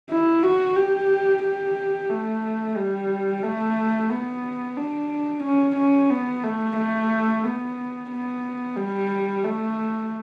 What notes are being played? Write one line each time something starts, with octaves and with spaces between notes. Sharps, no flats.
E4
F#4
G4
G4
A3
G3
A3
B3
D4
C#4
C#4
B3
A3
A3
B3
B3
G3
A3